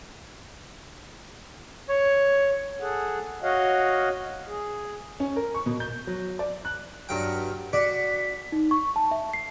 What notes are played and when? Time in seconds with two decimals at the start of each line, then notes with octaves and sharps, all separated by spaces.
1.89 C#5
2.80 G#4 A4 F#5
3.43 F#4 C#5 D#5 F5 F#5
4.48 G#4
5.20 C#4
5.36 A#4
5.54 C#6
5.66 B2
5.80 G6
6.07 F#3
6.39 D5
6.65 F#6
7.09 G2 F#3 G5 F6
7.73 F#4 D5 B6
8.52 D#4
8.71 C#6
8.96 A5
9.11 E5
9.33 C7